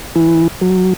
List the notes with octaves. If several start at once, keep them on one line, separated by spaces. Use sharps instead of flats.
E3
F#3